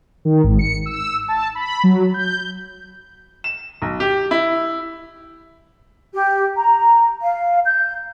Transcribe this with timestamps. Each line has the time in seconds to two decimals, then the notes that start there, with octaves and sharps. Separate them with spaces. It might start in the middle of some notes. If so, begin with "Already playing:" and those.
0.25 D#3
0.44 G#1
0.59 C#7
0.86 E6
1.28 A5
1.55 B5
1.83 F#3
2.14 G6
3.44 E7
3.82 B1
4.00 G4
4.31 E4
6.15 G4
6.56 A#5
7.22 F5
7.65 G6